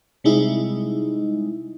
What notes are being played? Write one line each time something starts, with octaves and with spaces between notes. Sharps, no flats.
C3 G3 G#3 D#4 E4